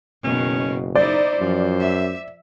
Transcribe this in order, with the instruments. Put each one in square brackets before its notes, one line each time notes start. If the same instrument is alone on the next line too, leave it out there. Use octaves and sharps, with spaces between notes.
[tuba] F#1 [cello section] B2 D#3 [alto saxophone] C#4
[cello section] D#4 E4 [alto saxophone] C5 [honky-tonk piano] D5
[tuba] F#2 [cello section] F3
[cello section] E5